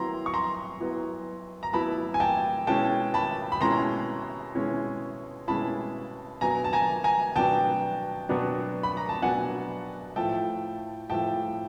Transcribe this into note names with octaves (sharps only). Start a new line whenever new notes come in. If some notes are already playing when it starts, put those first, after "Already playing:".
Already playing: F#3 B3 E4 A#5 C6
C#6
A#5 C6
F#3 B3 E4
A#5
F#3 B3 E4 A5 B5
G#5
G5 A5
B2 G#3 C#4 E4 G5 A5
A5 B5
B5
B2 G#3 C#4 E4 A#5 C6
B2 G#3 C#4 E4
B2 G#3 C#4 E4 A5 B5
B2 F#3 B3 D4 G#5 A#5
A5
G#5 A#5
G#5 A#5
B2 F#3 B3 D4 G5 A5
B2 F#3 B3 D4
B5
A#5
A5
B2 F#3 B3 D4 F#5 G#5
A2 F3 A3 G5 A5
A2 F3 A3 G5 A5